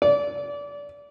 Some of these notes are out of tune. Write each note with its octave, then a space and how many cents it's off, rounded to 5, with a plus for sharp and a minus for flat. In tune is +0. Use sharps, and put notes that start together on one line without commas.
D5 -25